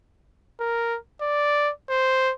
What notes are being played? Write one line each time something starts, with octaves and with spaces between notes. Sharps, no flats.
A#4
D5
C5